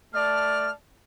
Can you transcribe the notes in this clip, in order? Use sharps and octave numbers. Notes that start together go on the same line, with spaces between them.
A3 D5 A5 F6